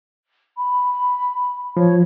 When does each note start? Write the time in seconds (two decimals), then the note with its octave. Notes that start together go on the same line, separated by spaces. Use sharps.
0.57 B5
1.77 F3 C#5